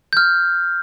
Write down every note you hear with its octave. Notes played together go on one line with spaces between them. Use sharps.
G6
F6